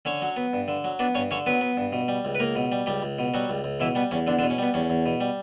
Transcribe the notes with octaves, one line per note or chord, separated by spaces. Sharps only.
D3 C#4 C#5
F#3
B3
G2
D3
F#3
B3 D4 D5
G2 C#4 C#5
D3 C#4 C#5
F#3 B3 B4
B3
G2
B2
G3
C#2
B4
C#2 A#3 A#4
B2
G3
C#2 G3 G4
C#2
B2
F#3 G3 F#4
C#2
C#2
B2 E3 E4
G3 B3
E2 C#4
E2 D3 D4
D3 D4
B2
C#4
G3 B3
E2 C#4
E2
B2
G3